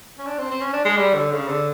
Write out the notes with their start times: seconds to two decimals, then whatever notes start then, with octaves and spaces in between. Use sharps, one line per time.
0.19 C#4
0.26 D4
0.38 C4
0.51 C4
0.61 C#4
0.73 D4
0.85 G#3
0.97 G3
1.15 D3
1.32 C#3
1.48 D3